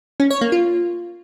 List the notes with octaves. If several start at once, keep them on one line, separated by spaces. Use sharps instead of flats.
C#4
C#5
A#3
F4